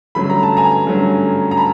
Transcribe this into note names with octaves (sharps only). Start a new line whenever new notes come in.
G2 D3 F#3 A3 C#4 B5
A#5
A5
G#5 A#5
G2 D3 F#3 A3 C#4
A#5
A5 B5